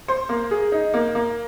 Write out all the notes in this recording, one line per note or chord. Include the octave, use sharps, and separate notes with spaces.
C5
A#3
G#4
D#4
A#3
A#3